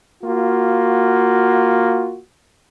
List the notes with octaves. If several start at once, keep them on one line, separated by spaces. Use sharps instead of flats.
A#3 F4 F#4